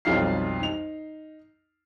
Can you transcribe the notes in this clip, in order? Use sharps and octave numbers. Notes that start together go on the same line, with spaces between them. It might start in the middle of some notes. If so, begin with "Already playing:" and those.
B1 F2 G3 D#4 F5 C7
D#4 F7